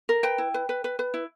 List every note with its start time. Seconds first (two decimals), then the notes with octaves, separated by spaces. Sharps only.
0.09 A#4
0.23 B4 G5
0.38 E4
0.54 B4
0.69 B4
0.84 B4
0.99 B4
1.14 E4